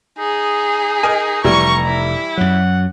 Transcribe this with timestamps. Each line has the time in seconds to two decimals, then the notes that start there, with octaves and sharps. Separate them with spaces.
0.19 D#4 G#4
1.03 A#4 D#5 G#5
1.44 F1 E3 G3 A#5 C#6
1.86 E4
2.37 F#2 F#3 F#5